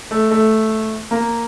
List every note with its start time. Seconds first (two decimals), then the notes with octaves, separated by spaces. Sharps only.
0.11 A3
0.31 A3
1.11 A#3